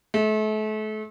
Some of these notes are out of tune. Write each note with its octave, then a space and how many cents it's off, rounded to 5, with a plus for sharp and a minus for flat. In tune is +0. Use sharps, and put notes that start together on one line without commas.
A3 -35